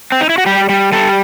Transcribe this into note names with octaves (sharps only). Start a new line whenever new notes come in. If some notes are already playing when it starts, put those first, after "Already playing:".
C4
D#4
E4
F#4
G3 G4
G3
G3 A4